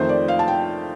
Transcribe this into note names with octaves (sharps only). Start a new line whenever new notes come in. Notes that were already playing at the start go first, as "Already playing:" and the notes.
Already playing: F2 D#3 A3 C5
D5
F5
A5
G5